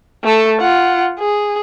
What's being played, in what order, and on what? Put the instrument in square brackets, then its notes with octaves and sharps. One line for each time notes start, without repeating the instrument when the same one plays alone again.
[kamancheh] A3 A4
F4 F#5
G#4